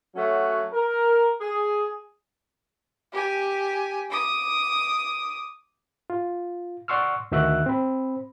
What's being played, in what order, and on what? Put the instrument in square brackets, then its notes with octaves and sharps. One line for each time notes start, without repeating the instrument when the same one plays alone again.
[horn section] F#3 A3 C#4 F#4
A#4
G#4
[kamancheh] G4 G#5
D6 D#6
[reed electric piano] F4
D5 F#5 C6 C#6 E6 F6
D2 D#3 F#4 E5 E6 F#6
C4 B5